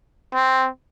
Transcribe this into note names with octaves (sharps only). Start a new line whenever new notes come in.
C4